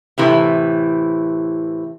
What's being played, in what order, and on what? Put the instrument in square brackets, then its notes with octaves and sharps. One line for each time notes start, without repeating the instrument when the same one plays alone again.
[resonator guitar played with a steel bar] A2 C3 E3